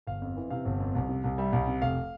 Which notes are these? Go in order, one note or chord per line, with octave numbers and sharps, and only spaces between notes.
G1 F5
F2
E3
C3 F5
G1
F2
C2
C3
C2
G3 E5
C2
C3
F1 F5